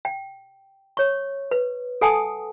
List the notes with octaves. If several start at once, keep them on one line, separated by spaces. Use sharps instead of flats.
G5
C#5 C#6
B4
A4 F#5 G#5 A5 D#6